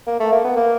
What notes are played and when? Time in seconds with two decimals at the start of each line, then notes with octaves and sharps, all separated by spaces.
0.07 A#3
0.20 A3
0.32 A#3
0.44 B3
0.57 A#3